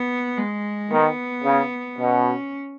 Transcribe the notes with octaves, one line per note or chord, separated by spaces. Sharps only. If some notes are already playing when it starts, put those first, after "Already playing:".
Already playing: B3
G#3
D#3 B3
C#3
B2 C#4